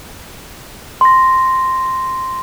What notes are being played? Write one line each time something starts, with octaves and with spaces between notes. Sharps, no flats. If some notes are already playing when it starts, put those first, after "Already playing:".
C6 A#6